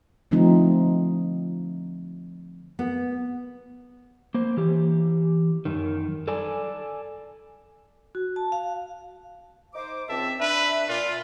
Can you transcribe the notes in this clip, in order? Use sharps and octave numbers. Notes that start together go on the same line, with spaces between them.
D3 F3 A3 C4 D#4
B3
A#3 C5
E3 G4
F#2 D#3
A4 D5 G#5
F#4
A5
F5
D#4 C5 D6
C#2 C4 E5 A5
D4 B4 E5
A#2 F4 D5